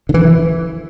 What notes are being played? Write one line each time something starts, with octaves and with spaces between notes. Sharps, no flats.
D3
E3
E3